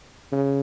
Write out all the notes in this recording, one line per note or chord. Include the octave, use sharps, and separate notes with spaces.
C#3